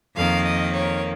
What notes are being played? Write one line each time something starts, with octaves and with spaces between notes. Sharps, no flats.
F2 D#3 A#3 F5
D#5
C#5